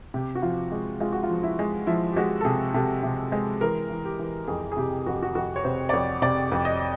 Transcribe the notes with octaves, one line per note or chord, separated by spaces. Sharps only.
C3 G4
F#4
F3 F4
G#3
G#3 F4
F#4
F4
F3
E4
G#3
F3 E4
G4
G#3 F#4
A4
C3 G#4
C3 A4
C3
G#3
E3 A#4
E3
G4
E3
F2 G#4
G#4
C3 G4
F2 F#4
G4
F#4
F2 F#4
C#5
C3 C5
D5
F2 C#5
C3 D5
F2
D#5